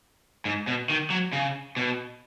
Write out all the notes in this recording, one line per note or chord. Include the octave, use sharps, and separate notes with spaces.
G#2
B2
D#3
F#3
C#3
B2